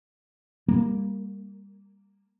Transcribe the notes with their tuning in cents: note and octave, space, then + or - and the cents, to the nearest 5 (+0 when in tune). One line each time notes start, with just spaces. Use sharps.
G3 +20 A#3 +0